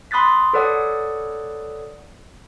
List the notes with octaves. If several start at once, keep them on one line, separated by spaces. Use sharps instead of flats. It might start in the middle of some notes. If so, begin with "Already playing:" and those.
B5 C6 D#6 F#6 A6 B6
A4 B4 C#5 D5 F#5 D#6